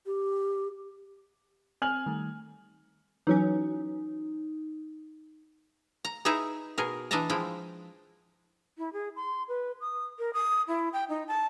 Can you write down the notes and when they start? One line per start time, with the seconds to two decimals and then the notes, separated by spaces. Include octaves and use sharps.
0.06 G4
1.82 C4 G#5 F6 F#7
2.06 D#3 G3 A3
3.27 E3 F#3 C#4 D#4
6.05 A#5
6.25 D#4 E4 G#4 B4 E5 A#5
6.78 B2 G#4 A#4
7.11 E3 D4 D#5 E5 A5 A#5
7.30 F3 G#3 E4 G5
8.78 E4
8.93 G#4
9.16 C6
9.48 B4
9.81 D#6
10.19 A#4
10.34 D#6
10.68 E4
10.93 G5
11.09 D#4
11.28 A5